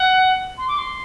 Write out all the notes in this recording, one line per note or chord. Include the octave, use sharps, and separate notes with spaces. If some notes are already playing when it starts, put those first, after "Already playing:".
Already playing: F#5
C6
D6
C6